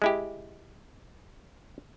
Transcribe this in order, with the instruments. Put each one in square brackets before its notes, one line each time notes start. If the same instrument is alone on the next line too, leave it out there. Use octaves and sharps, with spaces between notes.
[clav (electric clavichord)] G#3 E4 G4